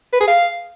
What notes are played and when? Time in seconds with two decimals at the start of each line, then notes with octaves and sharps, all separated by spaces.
0.13 B4
0.20 G#4
0.27 F5